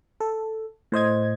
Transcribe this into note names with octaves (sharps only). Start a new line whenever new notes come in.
A4
A2 C5 D#5 G#6